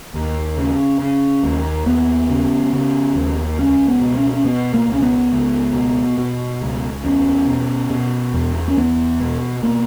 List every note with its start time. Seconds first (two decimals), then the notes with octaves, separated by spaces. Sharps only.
0.14 D#2
0.57 C#3
0.99 C#3
1.44 D#2
1.86 D#2 B3
2.29 C#3
2.73 C#3
3.16 D#2
3.59 C#2 C#4
3.88 B3
4.01 B2
4.16 C#4
4.33 C#4
4.44 B2 B3
4.74 A#3
4.88 C#2 C#4
5.02 B3
5.32 C#2
5.74 B2
6.18 B2
6.61 C#2
7.03 E2 C#4
7.47 B2
7.90 B2
8.34 E2
8.68 C#4
8.77 E2 B3
9.20 B2
9.63 B2 A#3